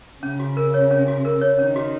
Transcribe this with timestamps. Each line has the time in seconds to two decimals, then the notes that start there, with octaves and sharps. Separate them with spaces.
0.23 C#3 C#4
0.40 F#4
0.57 A#4
0.74 C#5
0.91 C#4
1.08 F#4
1.25 A#4
1.41 C#5
1.59 D#3 C#4
1.76 F#4